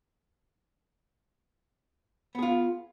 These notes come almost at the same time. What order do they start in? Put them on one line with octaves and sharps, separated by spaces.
B3 G#4 F4